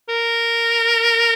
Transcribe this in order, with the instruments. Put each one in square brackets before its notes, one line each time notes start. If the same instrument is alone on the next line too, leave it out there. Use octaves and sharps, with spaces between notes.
[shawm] A#4